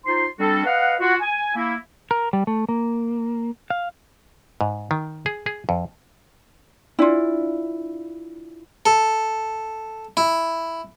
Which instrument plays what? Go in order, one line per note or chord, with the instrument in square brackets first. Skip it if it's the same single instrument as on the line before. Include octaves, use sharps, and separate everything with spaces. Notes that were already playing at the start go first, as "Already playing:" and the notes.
[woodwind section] D#4 F4 C5 C6
G3 C4 D4 F#4 A4
B4 D#5 F5 F#5
F4 F#4
G#5
A#3 E4
[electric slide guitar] A#4
G3
A3
A#3
F5
[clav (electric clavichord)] G#2
D#3
G#4
G#4
F2
[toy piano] D4 D5 [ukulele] E4 F4
[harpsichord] A4
E4